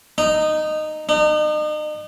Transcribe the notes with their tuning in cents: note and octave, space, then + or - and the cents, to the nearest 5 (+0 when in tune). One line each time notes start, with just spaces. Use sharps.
D#4 -15
D#4 -40